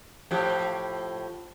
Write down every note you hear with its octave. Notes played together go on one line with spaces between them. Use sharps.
A2 F3 G4